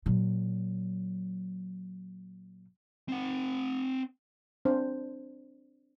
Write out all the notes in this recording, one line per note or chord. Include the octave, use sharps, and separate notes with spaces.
A#2 F#3
C4 F#5
C4 D4 C5